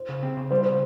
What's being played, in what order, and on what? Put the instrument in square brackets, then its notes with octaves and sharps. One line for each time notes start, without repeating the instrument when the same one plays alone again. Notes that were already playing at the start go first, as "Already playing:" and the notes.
Already playing: [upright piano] C5
[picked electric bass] C#3
C4
C#3
[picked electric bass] G3 [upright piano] C5
[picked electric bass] C#3